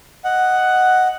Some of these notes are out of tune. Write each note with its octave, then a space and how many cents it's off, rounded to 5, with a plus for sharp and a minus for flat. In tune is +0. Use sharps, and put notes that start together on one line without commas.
D#5 +0 F#5 +5